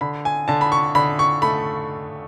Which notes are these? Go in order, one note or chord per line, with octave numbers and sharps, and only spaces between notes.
D3 B5
G#5
D3 A5
B5
C#6
D3 B5
C#6
A3 B5